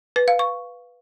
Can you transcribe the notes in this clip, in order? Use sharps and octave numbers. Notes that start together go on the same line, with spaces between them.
B4
F5
C#6